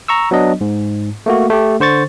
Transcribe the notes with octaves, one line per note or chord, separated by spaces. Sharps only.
A#5 C#6 E6
F#3 B3 D4 D#5
G#2
A3 A#3 F#4
A3 G4
D3 C5 C#6 A6